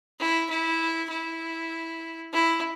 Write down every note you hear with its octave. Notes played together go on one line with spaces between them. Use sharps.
E4
E4
E4
E4